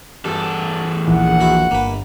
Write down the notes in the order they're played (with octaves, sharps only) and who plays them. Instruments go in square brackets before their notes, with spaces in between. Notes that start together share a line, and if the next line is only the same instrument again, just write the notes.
[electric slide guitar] E2 A4 [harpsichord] G2
[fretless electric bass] D#1 A#1 E3 [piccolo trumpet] F#5
[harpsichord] E4 F#4
[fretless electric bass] G1 [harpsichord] A#3 B4